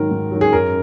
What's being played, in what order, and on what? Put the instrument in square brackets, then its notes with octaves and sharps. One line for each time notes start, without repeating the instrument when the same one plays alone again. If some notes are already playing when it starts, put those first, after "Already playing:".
Already playing: [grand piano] G#2 D#3 F#3 A#4
G#2
D#3 F#3
G#4
F#2 A#4